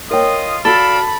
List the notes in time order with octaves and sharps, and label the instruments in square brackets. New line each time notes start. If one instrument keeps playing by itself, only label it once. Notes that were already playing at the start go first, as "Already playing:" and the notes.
[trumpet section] F4 D#5 D#6 [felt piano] A#4 C#5 G5
[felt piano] F#4 [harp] A4 [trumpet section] D5 F5 A5 [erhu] B5